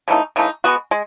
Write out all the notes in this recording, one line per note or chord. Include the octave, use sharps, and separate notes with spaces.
C#3 E3 A3 D#4
C#3 E3 A3 D#4
G#3 B3 F#4
G#3